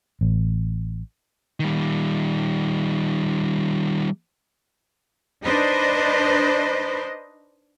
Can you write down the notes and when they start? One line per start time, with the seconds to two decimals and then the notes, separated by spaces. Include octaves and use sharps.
0.21 A1
1.60 D#3 G3
5.45 D4 D#4 B4 C5 D#5